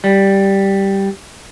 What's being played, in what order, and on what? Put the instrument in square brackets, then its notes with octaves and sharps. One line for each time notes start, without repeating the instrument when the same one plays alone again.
[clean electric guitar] G3